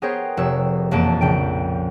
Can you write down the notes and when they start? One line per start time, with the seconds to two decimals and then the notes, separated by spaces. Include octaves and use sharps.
0.02 B3 G#4 A#4 C5 C#5 G5
0.37 F1 C#5 E6
0.91 E1 F2 A#3 A5 D7
1.21 A#1 C#3 G5 D7